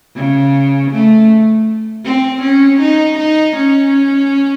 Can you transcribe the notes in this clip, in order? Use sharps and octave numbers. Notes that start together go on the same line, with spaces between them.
C#3
A3
C4
C#4
D#4
D#4
C#4